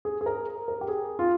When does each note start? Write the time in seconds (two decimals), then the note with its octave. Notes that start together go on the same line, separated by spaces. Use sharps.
0.05 G#4
0.21 G#4
0.26 A#4
0.68 A#4
0.81 G4
0.88 G#4
1.19 F4